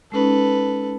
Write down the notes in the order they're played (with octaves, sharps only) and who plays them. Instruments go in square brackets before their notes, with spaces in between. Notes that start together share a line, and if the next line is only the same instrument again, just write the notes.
[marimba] G#3 C#4 D#4 [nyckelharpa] A4 B4